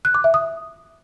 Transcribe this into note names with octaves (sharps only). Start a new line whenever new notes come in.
F#6
D6
E5
D#6